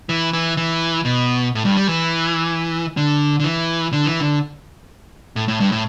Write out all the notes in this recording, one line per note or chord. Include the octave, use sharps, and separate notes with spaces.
E3
E3
E3
B2
A2
G2
G3
E3
D3
D3
E3
D3
E3
D3
A2
A2
G2
A2